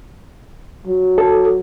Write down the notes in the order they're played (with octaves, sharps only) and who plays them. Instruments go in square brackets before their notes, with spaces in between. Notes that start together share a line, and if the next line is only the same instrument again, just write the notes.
[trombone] F#3
[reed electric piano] A4